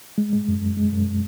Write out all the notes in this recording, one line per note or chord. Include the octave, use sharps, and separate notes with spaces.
G#3
G#3
F#2
F#2
G#3
F#2